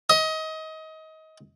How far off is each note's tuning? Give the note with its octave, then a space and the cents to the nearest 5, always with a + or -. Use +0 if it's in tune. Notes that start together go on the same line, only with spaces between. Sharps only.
D#5 +25